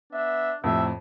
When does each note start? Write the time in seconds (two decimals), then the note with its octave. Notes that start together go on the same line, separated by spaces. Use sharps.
0.13 B3 D4 E5
0.64 F2 A2 C3 E5